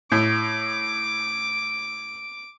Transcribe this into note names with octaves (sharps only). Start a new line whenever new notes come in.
A2 D6